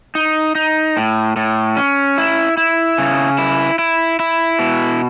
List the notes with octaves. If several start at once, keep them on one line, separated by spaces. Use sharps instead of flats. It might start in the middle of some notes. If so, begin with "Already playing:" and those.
D#4
D#4
A2
A2
C#4
E4
E4
C#3
E4
E4
E4
B2